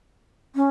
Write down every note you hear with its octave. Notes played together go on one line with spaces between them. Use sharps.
C#4